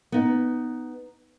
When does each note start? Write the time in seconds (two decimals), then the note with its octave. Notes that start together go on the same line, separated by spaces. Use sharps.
0.12 B3 D#4